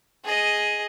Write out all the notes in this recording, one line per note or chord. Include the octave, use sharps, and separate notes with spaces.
G#4 D#5